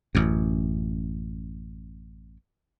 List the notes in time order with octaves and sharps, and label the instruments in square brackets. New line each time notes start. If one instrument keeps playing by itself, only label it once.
[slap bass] A1 F#2